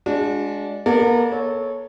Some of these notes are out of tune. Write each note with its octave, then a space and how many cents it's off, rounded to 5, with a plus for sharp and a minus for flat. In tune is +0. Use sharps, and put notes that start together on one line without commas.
G#3 +0 D4 -15 F#4 -40
A#3 +45 A#4 -40 D5 -15
A4 -20 C#5 +0